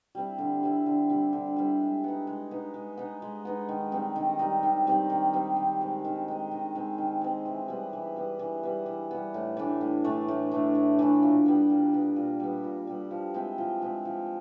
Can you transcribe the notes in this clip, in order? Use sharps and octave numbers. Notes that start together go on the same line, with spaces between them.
G3 C4 E4
D3
G3 C4 E4
D3
G3 C4 E4
D3
G3 C4 E4
G#3
B3 D#4
G#3
B3 D#4
G#3
B3 D#4
G#3
B3 D#4
D#3
G3 C4 D#4
D#3
G3 C4 D#4
D#3
G3 C4 D#4
D#3
G3 C4 D#4
D#3
G#3 C4
D#3
G#3 C4
D#3
G#3 C4
D#3
G#3 C4
E3
G3 B3
E3
G3 B3
E3
G3 B3
E3
G3 B3
A2
E3 A3 D4
A2
E3 A3 D4
A2
E3 A3 D4
A2
E3 A3 D4
A#2
G3 B3
A#2
G3 B3
A#2
G3 B3
A#2
G3 B3
F3
G#3 C4 E4
F3
G#3 C4 E4
F3